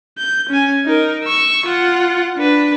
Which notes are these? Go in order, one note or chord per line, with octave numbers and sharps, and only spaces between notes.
G6
C#4 G#5
D#4 A#4
C#6 E6
F4 F#5
D4 B4